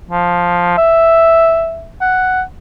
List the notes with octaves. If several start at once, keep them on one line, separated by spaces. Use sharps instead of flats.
F3
E5
F#5